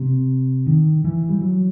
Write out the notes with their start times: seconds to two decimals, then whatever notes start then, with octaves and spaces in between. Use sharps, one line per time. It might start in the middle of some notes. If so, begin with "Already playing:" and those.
Already playing: C3
0.67 D#3
1.04 E3
1.29 G3
1.41 F#3